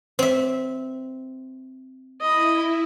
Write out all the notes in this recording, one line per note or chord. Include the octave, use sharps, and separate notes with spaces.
C4 E5
E4 D#5 B5